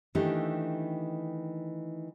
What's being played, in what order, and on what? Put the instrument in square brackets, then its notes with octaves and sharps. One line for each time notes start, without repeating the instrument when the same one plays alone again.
[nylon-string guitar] D#3 E3 A3 A#3 D4 G4